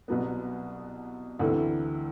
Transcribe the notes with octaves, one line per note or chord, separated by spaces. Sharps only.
C2 B2 F#3 B3
D2 C3 E3 A3